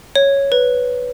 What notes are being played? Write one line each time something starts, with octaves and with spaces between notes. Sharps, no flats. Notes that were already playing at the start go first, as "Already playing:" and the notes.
C#5
B4